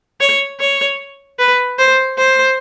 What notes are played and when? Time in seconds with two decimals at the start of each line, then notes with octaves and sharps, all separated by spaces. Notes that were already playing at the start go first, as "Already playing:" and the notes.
0.20 C#5
0.60 C#5
1.39 B4
1.79 C5
2.18 C5